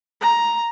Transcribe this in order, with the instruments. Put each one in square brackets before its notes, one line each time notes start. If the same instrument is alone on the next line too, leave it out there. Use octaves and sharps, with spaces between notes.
[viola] A#5